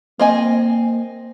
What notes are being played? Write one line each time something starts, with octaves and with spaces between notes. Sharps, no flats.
A#3 C4 D#5 G#5